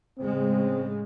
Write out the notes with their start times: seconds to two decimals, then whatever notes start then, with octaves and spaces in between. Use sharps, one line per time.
0.19 A2 C#3 G#3 C4